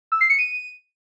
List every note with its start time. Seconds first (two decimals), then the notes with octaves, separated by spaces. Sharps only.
0.12 E6
0.21 C7
0.30 C#7
0.39 D#7